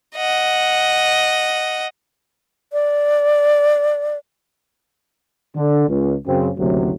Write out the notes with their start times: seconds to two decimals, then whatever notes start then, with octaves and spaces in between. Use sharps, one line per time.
0.16 D#5 F#5
2.73 D5
5.56 D3
5.89 C#2
6.27 F#2 C#3 C4
6.58 F#1 D2 C3 F#3